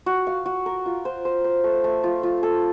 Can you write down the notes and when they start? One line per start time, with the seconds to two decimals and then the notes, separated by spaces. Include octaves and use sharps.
0.06 F#4
0.27 F5
0.46 F#4
0.66 A#4
0.86 F4
1.05 C5
1.25 C5
1.44 C5
1.64 A3
1.84 A3
2.04 F4
2.23 F4
2.43 A4